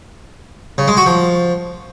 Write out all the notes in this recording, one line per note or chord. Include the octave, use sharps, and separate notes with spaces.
C#3
G#3
F#4
F3